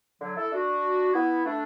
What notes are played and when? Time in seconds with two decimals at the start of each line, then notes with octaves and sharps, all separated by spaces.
0.21 D3 F#3
0.36 E4 A4
0.52 D4 F#4
1.14 B3 E4
1.45 A3 D4